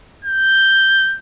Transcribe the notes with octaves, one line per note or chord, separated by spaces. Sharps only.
G6